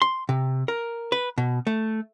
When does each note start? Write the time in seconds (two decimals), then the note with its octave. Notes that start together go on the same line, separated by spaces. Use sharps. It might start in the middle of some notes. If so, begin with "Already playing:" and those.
0.02 C6
0.29 C3
0.68 A#4
1.12 B4
1.38 B2
1.67 A3